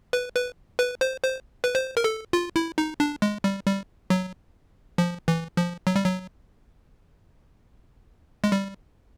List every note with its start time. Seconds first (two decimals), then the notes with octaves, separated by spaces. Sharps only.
0.13 B4
0.35 B4
0.79 B4
1.01 C5
1.23 C5
1.64 B4
1.75 C5
1.97 A#4
2.04 A4
2.33 F4
2.56 E4
2.78 D#4
3.00 D4
3.22 G#3
3.44 G3
3.66 G3
4.10 F#3
4.98 F3
5.28 E3
5.57 F3
5.87 F#3
5.96 G3
6.04 F#3
8.44 G#3
8.52 G3